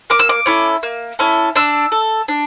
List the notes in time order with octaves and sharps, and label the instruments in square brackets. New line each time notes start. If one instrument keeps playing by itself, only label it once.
[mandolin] A#3 D6
E6
D6
C#4 E4 A4
A#3
C#4 E4 A4
D4 E6
A4
D4